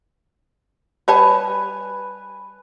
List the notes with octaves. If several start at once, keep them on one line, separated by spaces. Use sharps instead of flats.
G3 B4 C#5 G#5 A5